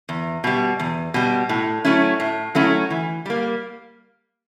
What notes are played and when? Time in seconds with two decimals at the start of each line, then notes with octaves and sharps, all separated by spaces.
0.09 E2
0.44 B2 G3
0.80 E2
1.14 B2 G3
1.49 A2
1.85 F#3 A3 C#4 E4
2.20 A2
2.55 F#3 A3 C#4 E4
2.90 E3
3.26 G3 A#3